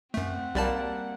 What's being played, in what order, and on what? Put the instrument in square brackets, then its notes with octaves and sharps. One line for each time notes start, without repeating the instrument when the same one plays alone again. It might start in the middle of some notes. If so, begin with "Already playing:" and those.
[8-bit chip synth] F#2 A3 [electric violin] C4 F#5
[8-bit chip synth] B1 D5 A5 [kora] G3 A#3